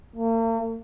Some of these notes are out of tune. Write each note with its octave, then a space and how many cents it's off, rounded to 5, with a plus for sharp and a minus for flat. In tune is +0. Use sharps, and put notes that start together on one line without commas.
A#3 -45